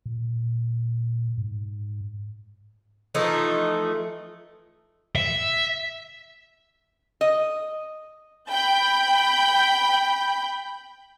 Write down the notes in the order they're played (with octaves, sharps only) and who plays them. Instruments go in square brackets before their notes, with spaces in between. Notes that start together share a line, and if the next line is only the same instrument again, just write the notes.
[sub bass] A#2
G#2
[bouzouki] E3 F3 A3 D#4
[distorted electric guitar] E5
[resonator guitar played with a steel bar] D#5
[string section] G5 B5 G6